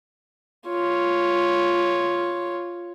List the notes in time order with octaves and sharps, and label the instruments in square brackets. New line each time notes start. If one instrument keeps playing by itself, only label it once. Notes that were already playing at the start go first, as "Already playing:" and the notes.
[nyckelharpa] F4 C#5